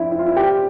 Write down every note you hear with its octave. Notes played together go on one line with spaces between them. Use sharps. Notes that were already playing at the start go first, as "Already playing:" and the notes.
Already playing: F2 C4 D4 E4
E4
F4
E4
G4